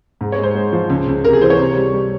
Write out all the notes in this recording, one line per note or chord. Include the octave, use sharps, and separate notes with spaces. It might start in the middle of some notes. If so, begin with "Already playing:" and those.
G#2
C#5
G#3
C5
G#3
F3
C#2
C#2
C3 A#4
G#4
E3 C5
C#5
C3
G3
G3